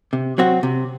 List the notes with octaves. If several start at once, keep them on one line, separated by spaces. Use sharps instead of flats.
C3
F#3 C4 F#4
C3